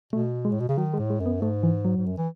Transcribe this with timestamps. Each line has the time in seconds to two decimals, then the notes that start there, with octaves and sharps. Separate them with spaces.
0.13 B2 A3
0.45 G#3
0.52 A2
0.60 B2
0.69 C#3
0.78 D#3 F#3
0.93 G#3
0.99 A2
1.10 G#3
1.20 F#2
1.26 B3
1.42 G#2 A3
1.63 E3
1.85 F#3
1.97 G#2
2.06 F#2
2.18 E3